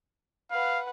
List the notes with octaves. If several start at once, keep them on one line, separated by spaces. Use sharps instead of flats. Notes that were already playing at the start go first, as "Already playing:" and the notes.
B4 F5 F#5